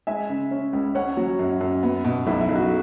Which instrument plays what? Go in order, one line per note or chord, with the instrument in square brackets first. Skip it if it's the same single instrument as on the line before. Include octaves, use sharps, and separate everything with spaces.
[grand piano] G#3 E5 G#5
C#3
C#4
C#2
C#4 C#5 F#5
F#3
F#2
F#2
B3
B2
B1 E4
E4
B1
F#4